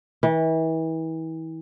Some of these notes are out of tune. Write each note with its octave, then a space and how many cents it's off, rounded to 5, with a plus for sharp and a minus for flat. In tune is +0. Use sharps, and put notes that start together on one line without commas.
E3 -35